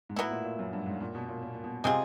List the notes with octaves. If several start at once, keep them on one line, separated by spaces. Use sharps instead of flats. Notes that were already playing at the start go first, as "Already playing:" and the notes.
G#2
A2 F#3 B3 E4
A#2
A#2
F#2
G2
G#2
A#2
B2
A#2
A#2
A#2
B2
C3 G#3 C4 F4 G#4